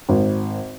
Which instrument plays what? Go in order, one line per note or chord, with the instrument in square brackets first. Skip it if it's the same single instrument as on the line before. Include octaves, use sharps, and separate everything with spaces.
[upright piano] G#1